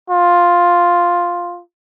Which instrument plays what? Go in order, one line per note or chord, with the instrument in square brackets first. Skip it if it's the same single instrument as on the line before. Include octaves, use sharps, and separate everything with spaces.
[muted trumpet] F4